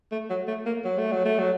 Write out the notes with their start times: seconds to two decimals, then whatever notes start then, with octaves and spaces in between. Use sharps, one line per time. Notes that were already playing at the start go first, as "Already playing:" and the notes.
0.12 A3
0.30 F#3
0.48 A3
0.66 A#3
0.85 F#3
0.98 A3
1.12 F#3
1.25 A3
1.39 F#3